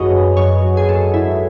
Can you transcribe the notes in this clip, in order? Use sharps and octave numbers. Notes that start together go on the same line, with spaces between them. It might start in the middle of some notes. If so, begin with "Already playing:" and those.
Already playing: G#1 F#2 F#3 F#4 G#4 B4 C#5 D#5
F#2
F#2 C#5
F#3
G#4
F#2 A4
G#1 E4